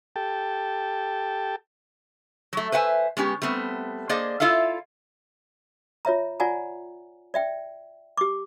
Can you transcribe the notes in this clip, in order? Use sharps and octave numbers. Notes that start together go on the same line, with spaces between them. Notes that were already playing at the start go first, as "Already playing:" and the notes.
G4 A4 G5 A5
F#3 A3
B4 C5 E5 F#5 G#5
G#3 B3 C#4 G4
G3 A3 B3 C4
A#3 G#4 C5 D5 D#5
E4 F4 A4 E5 F5
F4 C#5 E5 A#5
F4 D5 F#5 G#5 A#5
D5 E5 G5
G4 D6